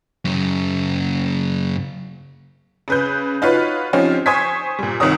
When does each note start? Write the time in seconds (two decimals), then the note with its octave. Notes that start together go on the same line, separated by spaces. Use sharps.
0.25 F#2 C#3
2.88 C#3 B4 G6
3.42 D#4 F4 F#4 B4 C#5
3.93 F3 C4 C#4 D#4 F4 G4
4.26 C5 G#5 C#6 D#6 G#6 B6
4.79 A#2 G3
5.00 C2 D#3 A#4 C#5 D#6